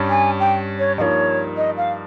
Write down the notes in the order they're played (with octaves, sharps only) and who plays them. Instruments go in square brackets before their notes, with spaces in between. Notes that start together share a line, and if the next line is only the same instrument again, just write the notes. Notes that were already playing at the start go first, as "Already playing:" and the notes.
Already playing: [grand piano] G2 G3 C#4
[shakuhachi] G#5
G5
C#5
[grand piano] G2 F3 A#3 D#4 [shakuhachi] C#5 D#5
[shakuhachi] D#5
F5